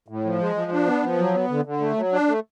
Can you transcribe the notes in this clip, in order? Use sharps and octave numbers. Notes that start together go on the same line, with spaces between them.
A2
F3
G#3
F3
D4
B3
F3
F#3
B3
D3
D3
A3
F#3
D4
A3